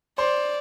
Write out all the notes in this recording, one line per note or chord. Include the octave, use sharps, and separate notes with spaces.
C5 D5 C6